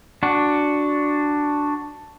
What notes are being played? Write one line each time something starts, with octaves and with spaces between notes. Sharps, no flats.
D4 F#4